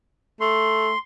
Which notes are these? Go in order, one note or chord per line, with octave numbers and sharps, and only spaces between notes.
A3 C6